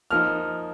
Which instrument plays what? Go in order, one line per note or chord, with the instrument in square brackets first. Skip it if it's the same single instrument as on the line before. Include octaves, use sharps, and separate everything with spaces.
[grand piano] F3 A#3 D#4 F6